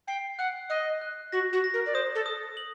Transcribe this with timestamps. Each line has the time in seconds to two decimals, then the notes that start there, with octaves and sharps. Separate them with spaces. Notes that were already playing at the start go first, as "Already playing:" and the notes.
0.08 G5 C7
0.39 F#5 F#6
0.70 D#5 F#6
1.01 F#6
1.32 F#4 A#6
1.53 F#4
1.64 A#6
1.74 A#4
1.86 D5
1.94 C5 D#6
2.15 A4
2.26 D#6
2.57 F#7